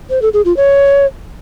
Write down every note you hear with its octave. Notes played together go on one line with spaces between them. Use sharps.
C5
A4
G#4
F4
C#5